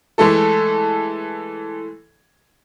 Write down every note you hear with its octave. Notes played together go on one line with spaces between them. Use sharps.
E3 G#3 A3 A4